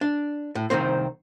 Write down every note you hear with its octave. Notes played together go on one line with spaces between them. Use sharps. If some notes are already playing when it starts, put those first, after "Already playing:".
D4
A2
C2 G#2 D#3 C4 C5